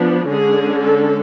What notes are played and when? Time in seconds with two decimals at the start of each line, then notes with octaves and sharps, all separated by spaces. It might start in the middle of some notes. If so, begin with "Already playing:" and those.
Already playing: F3 B3 D4
0.27 D3 G#3 C#4 G#4
0.82 A4